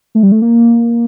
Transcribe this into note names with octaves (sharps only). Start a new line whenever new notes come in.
A3
G3
A3
A#3